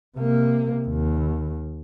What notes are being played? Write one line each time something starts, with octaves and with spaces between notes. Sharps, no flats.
C3 A#3
D#2